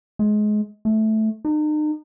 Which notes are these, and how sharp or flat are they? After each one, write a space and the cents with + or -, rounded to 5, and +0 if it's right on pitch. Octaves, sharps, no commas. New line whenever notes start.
G#3 +25
A3 -10
D#4 -40